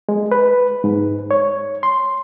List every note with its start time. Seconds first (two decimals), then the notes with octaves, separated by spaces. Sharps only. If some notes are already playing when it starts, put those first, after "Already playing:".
0.09 G#3
0.32 B4
0.84 G#2
1.31 C#5
1.83 C6